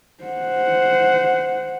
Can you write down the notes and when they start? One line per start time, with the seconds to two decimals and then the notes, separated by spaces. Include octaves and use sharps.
0.24 C5 F#5